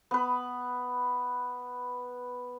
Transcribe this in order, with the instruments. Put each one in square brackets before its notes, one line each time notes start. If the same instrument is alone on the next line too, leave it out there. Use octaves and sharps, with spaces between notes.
[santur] B3 B4